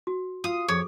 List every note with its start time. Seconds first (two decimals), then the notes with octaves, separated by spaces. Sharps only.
0.07 F#4
0.44 F4 F5 D#6
0.68 F2 G#4 A4 C#5